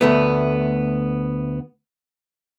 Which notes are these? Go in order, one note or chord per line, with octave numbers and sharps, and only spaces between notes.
D2 A3 B3